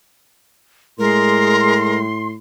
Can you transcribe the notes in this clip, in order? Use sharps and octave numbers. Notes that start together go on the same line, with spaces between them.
A2 G#3 A#4 C6